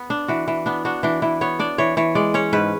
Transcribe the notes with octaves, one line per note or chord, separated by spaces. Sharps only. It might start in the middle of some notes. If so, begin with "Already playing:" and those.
Already playing: B3
D4
E3 F#4
E3
B3 D4
D4 F#4
E3 D4
E3 E4
B3 C#5
D4 D5
E3 C#5
E3 C#5
G#3 D5
C#4 C#5
G#2 B4